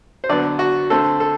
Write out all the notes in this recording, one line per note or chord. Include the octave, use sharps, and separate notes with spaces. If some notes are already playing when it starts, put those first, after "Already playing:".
C5
D3 F#3 B3 D5
F#4
D3 A3 C4 A4
A4